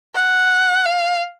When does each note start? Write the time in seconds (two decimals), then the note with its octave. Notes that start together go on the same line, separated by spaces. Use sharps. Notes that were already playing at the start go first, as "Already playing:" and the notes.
0.14 F#5
0.86 F5